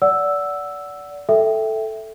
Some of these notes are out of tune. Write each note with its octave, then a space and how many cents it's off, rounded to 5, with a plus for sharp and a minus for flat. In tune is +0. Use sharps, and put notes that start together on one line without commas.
D5 -25 F#5 +0 E6 +0
A4 +0 E5 +0 G5 +0